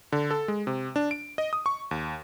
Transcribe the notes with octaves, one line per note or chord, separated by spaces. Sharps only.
D3
A4
G#3
C3
D4
D7
D#5
D#6
C#6
D#2